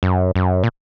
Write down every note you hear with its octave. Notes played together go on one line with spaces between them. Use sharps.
F#2
F#2
A#2